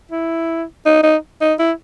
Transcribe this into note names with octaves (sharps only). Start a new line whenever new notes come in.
E4
D#4
D#4
D#4
E4